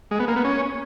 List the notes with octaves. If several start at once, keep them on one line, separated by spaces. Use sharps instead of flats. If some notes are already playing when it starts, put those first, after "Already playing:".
G#3
B3
A#3
B3
C#4